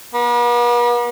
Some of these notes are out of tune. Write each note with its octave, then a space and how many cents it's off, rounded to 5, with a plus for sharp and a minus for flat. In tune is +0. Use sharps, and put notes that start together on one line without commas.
B3 -45